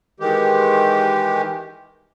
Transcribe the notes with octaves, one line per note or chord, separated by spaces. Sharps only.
D#3 E3 G#3 G4